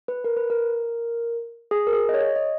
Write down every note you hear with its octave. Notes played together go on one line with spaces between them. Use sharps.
B4
A#4
B4
A#4
G#4
A#4
G#4
D#5
C#5
D#5